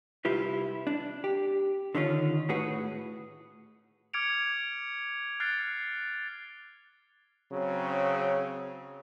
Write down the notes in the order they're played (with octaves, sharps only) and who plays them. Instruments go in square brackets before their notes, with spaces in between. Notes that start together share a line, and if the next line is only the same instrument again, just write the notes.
[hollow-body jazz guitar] C2 E4 F4 G4 B4
D4
G4
D3 D#3 C#4 F4
A2 F#4 G#4 B4 F#5
[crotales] D6 F6 G#6 C#7 D7 F7
F6 F#6 A6 C7 D7
[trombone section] C#3 F#3 C4